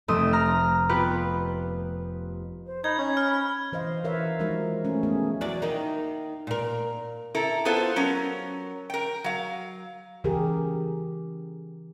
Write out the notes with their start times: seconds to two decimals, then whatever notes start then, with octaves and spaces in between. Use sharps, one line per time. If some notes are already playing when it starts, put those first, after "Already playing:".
0.08 F1 A3 C4 D#6 E7
0.33 A#5 F6
0.89 B3 F4 G4 B4
2.66 C5
2.84 D#4 B5 G#6
2.98 C#4
3.17 F6
3.72 E3 C5 D#5 F5
4.04 E3 A#4 B4 C#5 E5 F5
4.39 D#3 F3 G#3 D#4 F#4 A#4
4.85 A3 C#4
5.03 A3 B3 G#4
5.41 E2 F#3 D5
5.62 D#3 A#3 D#4
6.47 A#2 A#4
7.35 E4 A4 A#4
7.65 B3 E4 F4 A4 B4 C5
7.96 F#3 C#4 A#4
8.90 A#4 G5
9.24 F#3 F5
10.24 C#3 E3 G4 G#4 A#4